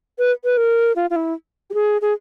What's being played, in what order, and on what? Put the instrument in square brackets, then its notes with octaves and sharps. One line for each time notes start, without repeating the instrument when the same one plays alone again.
[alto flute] B4
B4
A#4
F4
F4
E4
G4
G#4
G#4